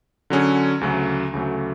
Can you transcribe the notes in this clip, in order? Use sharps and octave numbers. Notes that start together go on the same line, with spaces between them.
D3 F#3 C#4 G#4
D2 C#3 F#3 A3
D2 C#3 F#3 A3